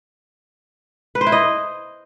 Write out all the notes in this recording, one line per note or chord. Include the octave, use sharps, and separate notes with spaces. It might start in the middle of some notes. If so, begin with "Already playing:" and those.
B4
C5
E4
D#5